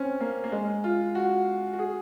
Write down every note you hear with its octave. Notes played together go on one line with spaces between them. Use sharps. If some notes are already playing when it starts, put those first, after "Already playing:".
Already playing: C4 C#4
A#3
A#3
G#3
F4
F#4
F#4
G#4